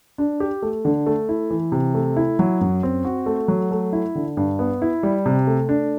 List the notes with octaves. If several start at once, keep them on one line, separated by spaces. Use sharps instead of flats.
D4
G4
A3
D3
A3
E4
E3
C3
A3
E4
F#3
F#2
C4
F#4
A3
F#3
A3
E4
D3
G2
B3
E4
G3
C3
A3
D4